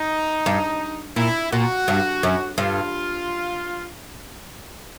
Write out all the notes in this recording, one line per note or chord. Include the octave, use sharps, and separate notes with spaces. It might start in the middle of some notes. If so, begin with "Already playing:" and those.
Already playing: D#4
G2
A#2 E4
A#2 F#4
G2
F#2
G2 F4